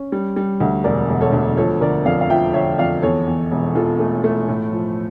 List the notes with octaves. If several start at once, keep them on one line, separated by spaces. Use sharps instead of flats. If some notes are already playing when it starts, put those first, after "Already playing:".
Already playing: C#4
G3
G3
D2
E1 A#4 D5
E1
A4 C#5
D2
F3 A4 C#5
D3 A#4 D5
F2 D5 F5
F5
F3 E5 G5
D3 C#5 E5
F2 D5 F5
E2 A4 C#5
E2
E1
E2 F4 A4
A3
A3
A2
F3